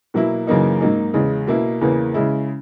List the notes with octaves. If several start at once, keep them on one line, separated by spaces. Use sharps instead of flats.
B2 F#3 A#3 E4
F#2 C#3 E3 A#3 D#4
G#2 F#3 A#3 D#4
E2 C#3 G#3
B2 A#3 E4
E2 C#3 E3 A#3
C#3 G#3 C#4 E4